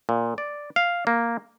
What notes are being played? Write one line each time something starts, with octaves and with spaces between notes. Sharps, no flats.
A#2
D5
F5
A#3